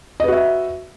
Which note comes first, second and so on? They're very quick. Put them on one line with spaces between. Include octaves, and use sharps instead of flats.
D#5 B4 F#4 E5